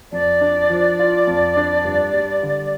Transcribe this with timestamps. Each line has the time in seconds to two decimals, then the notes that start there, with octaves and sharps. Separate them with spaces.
0.12 F2 D5
0.41 D4
0.70 F3
0.99 F4
1.27 F2
1.56 D4
1.85 G2
2.13 G3
2.43 D3